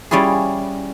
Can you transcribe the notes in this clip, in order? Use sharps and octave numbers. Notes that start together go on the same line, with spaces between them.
G3 C#4 E4 F4 G#4